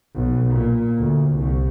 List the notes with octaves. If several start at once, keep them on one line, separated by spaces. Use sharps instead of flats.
B1
A#2
D2
C2